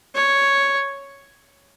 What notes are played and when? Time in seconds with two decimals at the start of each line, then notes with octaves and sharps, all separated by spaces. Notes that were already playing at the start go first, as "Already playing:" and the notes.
0.15 C#5